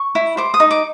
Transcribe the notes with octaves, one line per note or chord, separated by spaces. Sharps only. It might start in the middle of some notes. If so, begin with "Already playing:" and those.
Already playing: C#6
E4
C5 D6
D#6
D#4
D6